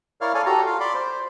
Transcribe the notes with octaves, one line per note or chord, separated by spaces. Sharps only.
E4 A#4 C#5 D5 F5 F6
A4 C#5 D5 F5 G#5
F#4 G4 A4 A#5
F4 F5
D5 B5 C6 D6
C5